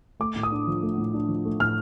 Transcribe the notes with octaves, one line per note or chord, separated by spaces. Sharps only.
A3 D6
A2
D#6
D4
F3
A3
A2
D4
F3
A3
A2 F6